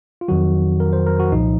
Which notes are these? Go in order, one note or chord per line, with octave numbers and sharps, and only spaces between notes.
F4
F2 D#3 F#3 F#4
A#4
C5
A#4
F#4
C2 A#2 F3 D#4